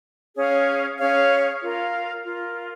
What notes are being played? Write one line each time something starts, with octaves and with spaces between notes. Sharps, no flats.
C#4 G#4 C#5 F5
C#4 G#4 C#5 F5
F4 A#4 F5
F4 A#4 F5